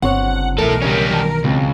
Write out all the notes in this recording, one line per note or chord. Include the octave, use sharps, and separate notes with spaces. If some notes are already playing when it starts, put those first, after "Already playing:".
G1 C#2 C4 C#5 F#5
B1 E3 A3 E4 A4 A#4
D2 C#3 G3 C#4 D#5
D#3 A5
C#2 B2 C4